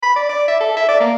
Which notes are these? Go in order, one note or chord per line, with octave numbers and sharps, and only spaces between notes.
B5
D5
D5
E5
A4
E5
D5
A#3